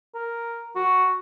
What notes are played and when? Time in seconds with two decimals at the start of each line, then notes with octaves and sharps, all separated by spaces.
0.15 A#4
0.76 F#4